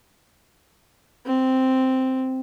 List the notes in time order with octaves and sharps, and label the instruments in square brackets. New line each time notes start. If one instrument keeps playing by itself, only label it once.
[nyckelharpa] C4